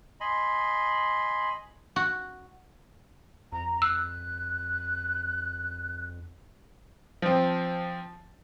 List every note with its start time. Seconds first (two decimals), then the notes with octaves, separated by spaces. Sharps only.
0.21 D#5 G#5 B5 C6
1.96 F#4
3.52 F2 A#5
3.82 E6 F#6
7.22 F3 C4